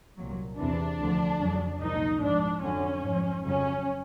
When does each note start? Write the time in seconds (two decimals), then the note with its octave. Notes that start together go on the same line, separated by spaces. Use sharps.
0.18 C2 A#2 F#3
0.58 E2 C3 E3 D4
0.99 D2 D3 F3
1.40 F2 C#3 F#3
1.81 C2 A#2 F3 D#4
2.21 G#2 F3 D4
2.62 F2 D3 F#3 C#4
3.03 G#2 F3
3.44 F2 C#3 F#3 C#4